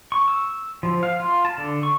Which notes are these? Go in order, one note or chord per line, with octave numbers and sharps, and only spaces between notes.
C#6
E6
F3
F5
F4
A5
D3
C#6